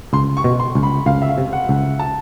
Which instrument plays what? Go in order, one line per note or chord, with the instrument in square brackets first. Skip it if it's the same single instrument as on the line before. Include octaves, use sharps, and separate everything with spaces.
[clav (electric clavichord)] C#2 [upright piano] C6
[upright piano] C#6
[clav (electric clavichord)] B2
[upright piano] C6
[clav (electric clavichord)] C#2
[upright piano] B5
[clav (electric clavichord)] C#2 [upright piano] F5
[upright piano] E5
F5
[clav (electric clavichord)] C3
[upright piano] F#5
[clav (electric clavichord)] C#2
[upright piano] A5